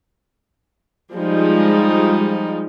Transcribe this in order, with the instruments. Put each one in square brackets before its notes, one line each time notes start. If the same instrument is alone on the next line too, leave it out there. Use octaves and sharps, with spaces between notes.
[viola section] F3 G3 G#3 D#4